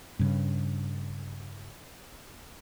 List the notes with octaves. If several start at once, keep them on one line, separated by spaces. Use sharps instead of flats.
G2 C#3